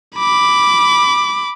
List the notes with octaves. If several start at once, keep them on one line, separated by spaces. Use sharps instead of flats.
B5 D6